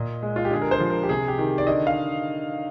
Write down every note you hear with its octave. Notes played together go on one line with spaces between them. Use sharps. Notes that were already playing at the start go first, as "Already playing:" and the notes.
Already playing: A#2 D#5
G#3
F4
G4
D3 G#4
A#4
C5
F3
A#4
G4
C3 G#4
G4
D#3
D5
D3 D#5
F5